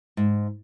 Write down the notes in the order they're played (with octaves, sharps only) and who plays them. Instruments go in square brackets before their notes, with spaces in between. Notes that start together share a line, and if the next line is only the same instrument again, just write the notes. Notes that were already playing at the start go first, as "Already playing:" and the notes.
[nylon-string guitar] G#2